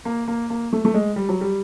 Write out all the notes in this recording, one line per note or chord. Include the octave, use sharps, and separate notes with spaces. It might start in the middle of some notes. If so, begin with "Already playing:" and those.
A#3
A#3
A#3
A3
A3
G#3
G3
F#3
G3